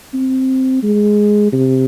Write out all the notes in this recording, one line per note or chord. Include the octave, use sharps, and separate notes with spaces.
C4
G#3
C3